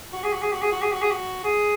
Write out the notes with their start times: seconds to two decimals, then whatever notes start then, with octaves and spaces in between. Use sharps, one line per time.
0.13 F#4
0.24 G#4
0.32 F#4
0.42 G#4
0.52 F#4
0.62 G#4
0.72 F#4
0.82 G#4
0.92 F#4
1.02 G#4
1.11 F#4
1.44 G#4